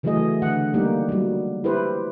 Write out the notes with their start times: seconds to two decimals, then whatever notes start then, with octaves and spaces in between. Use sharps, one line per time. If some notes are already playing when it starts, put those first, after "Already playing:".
0.03 C#3 E3 F#3 A3 G#4 D#5
0.42 D3 F#5
0.74 G3 A#3 D#4 G4
1.09 F#3 G3
1.64 E4 G4 B4 C5